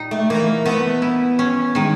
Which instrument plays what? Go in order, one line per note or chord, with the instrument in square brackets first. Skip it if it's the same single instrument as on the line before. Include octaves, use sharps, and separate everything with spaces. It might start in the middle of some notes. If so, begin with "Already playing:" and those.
Already playing: [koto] A#2 G3 D#4
[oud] A3
[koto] E3 [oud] A#3
[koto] A3 [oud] B3
[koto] E4
C#4
[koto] D#3 [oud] G#3